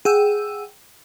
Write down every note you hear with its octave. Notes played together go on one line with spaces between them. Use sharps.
G#4 F#5 G5 E6